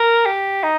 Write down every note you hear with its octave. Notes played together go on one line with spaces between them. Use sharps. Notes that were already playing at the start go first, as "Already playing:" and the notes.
Already playing: A#4
G4
D#4